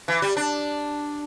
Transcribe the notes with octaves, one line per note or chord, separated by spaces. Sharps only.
E3
G3
D4